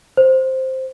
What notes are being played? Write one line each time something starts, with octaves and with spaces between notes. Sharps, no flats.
C5